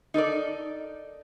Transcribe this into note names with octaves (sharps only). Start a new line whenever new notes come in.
D#4 A4 A#4 D5